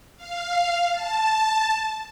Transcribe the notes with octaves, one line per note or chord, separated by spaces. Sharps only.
F5
A5